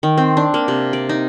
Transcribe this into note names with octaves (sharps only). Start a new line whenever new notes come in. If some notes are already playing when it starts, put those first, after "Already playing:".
D#3
C4
D4
A#3
C3
D5
D#4